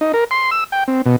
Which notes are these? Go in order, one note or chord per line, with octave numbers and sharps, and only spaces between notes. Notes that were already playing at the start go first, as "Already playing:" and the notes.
D#4
A#4
C6
E6
G5
C4
B2